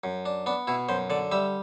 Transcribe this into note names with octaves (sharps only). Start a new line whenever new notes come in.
F#2
D4
B3 D4
B2 E4
F#2 C5
D3 D5
G3 E5